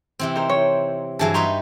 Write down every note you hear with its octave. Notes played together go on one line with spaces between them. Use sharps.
C3 E3 C4
D#4 A#4 C5
C#5
G2 E3 F#3 G#4 A5
G3 D#4 B4 A#5 C6 C#6